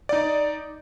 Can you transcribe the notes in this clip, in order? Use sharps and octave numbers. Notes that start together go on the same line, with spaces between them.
D#4 D5